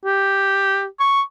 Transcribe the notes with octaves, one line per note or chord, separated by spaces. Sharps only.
G4
C#6